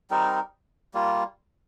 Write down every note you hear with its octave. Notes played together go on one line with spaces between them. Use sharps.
G3 C4 D#4 A#4
G3 A#3 F4